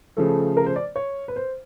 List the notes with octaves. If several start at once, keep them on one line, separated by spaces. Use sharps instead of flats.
C#3 F3 A3 A4
A#4
C5
D5
C#5
B4
C5